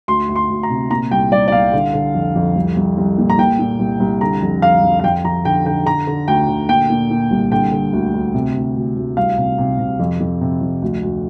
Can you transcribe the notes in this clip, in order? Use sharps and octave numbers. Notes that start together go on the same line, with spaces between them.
D2 C6
D2
C6
D2
A#5
C3
A#2 A#5
C2 G5
C2 D5
D5
C2 F5
D3
D3
F2
F2
C2
C2
C2
A#2
A#5
A#2 G5
A#2
C2
C2
D3 A#5
F2
F2 F5
F2
F5
F2 G5
F2 A#5
D3 G5
D3 G5
D3 A#5
D3
D2 G5
D3
A#2 G5
A#2
A#2
C2
D3 G5
D3
D2
D2
C3
D2
D2
D2
C2 F5
C3
C3
C3
F2
F2
C3
F2
D2
D2